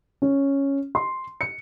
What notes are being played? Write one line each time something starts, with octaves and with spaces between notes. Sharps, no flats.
C#4
C6
C#7